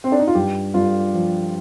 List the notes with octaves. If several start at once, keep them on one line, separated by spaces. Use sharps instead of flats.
C4
D4
D#4
F4
G2 G4
G2 F4
F3